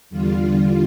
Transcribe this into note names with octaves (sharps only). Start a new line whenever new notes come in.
E2 D3 G3 F4
F4